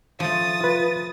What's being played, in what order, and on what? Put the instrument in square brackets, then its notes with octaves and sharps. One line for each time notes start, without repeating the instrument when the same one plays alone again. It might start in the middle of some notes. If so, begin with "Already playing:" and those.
[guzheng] F3 A3 [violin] D#6 A6
[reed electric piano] F4 B4